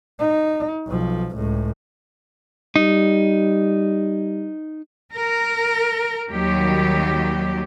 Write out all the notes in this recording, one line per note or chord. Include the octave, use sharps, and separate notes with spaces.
D#4
B1 F3
C#2 A2
G3 D#4
A#4
D#2 D#3 F#3 G3 G4